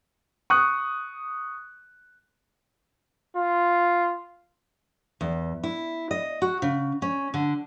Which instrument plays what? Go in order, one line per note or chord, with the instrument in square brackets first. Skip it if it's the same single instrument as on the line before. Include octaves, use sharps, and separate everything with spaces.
[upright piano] C#6 D#6 F#6
[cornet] F4
[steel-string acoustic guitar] E2
E4
D#5
F#4
C#3
C#4
D3